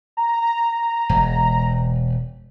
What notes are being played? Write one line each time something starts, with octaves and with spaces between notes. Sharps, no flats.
A#5
E1